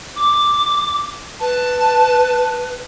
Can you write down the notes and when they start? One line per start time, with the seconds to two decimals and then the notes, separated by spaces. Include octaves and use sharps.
0.16 D6
1.40 B4 A5